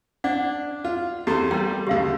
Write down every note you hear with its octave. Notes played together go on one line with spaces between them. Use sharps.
D4 D5 F#5
F4
E2 A3 G4 A#5 C6
G3 A#4 G5
D2 C#3 G4 F5